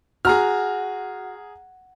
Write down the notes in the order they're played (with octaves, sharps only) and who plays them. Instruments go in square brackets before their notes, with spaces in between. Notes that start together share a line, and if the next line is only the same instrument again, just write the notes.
[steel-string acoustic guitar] F#4 [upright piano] G#4 A#5 F6